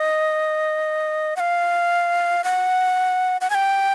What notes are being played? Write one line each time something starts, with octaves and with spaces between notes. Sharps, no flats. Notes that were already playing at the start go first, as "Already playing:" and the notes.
Already playing: D#5
F#5
F5
F#5
F#5
G#5
G5